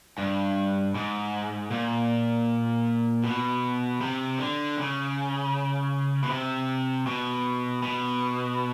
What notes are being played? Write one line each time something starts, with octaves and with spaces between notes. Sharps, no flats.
G2
G#2
A#2
B2
C3
D3
C#3
B2
C3
B2
B2